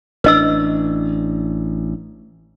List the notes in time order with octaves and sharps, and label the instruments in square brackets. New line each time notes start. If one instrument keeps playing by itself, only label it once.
[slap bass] A1 D4 [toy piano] B4 D#5 E6